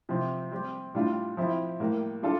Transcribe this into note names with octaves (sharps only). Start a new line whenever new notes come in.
C3 F3 C4
G3 C4 G4
A2 G3 D4 F4
F3 C4 E4
A2 G3 A#3
G3 D4 F4 A4